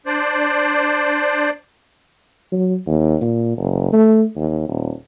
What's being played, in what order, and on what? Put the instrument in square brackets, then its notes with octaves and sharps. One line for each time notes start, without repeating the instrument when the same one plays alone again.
[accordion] D4 C5 D5
[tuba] F#3
D#2
A#2
F#1
A3
D#2
D#1